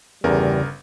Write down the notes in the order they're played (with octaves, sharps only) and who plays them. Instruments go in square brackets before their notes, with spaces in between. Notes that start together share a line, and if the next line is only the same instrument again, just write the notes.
[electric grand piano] G1 A#4 [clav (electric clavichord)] E2 [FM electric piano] C#3 [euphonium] G3